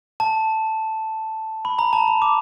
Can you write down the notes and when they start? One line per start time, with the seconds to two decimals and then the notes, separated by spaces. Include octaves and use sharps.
0.20 A5
1.65 B5
1.79 A#5
1.93 A5
2.08 A#5
2.22 D6